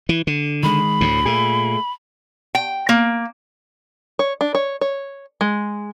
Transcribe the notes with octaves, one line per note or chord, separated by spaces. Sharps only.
E3
D3
D#3 G#3 B5
D2 A2
A#2 A3 G#4
G5
A#3
C#5
D4
C#5
C#5
G#3